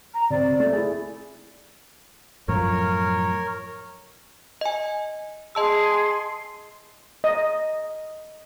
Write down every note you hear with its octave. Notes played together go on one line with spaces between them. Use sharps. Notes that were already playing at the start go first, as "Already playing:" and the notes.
A#5
C3 C4 D5
A3
E4 G#4
F#2 A2 F3 A#4 C#5
D#5 G#5
G#4 D#5 A5 C6 E6
D#5